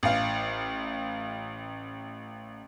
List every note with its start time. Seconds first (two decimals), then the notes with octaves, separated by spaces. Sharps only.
0.03 A1 F5